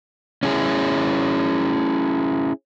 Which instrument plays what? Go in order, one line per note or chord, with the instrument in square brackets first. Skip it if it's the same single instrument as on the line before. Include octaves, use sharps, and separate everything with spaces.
[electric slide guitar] C#4 E4 G#4